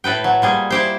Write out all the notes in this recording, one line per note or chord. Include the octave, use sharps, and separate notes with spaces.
A2 A4 B4 G5
F#3
A#2 G3 G#4
E4 G4 C5